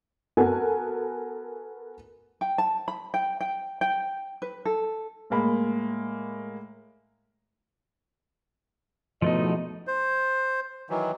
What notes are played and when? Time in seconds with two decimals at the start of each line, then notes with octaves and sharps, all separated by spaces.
0.37 B3 F#4 A4 A#4 G#5
2.41 G5
2.58 A5
2.88 B5
3.14 G5
3.40 G5
3.81 G5
4.42 B4
4.65 A4
5.30 A2 G#3 A#3 B5
9.22 E2 B2 F3 A3 D#4 D#5
9.87 C5
10.90 D#3 E3 F#3